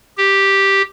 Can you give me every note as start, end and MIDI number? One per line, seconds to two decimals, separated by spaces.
0.18 0.82 67